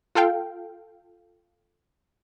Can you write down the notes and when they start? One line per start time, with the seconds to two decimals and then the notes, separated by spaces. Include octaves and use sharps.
0.15 F4 A4 F5 G5